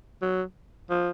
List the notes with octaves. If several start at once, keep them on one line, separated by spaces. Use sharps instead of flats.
F#3
F3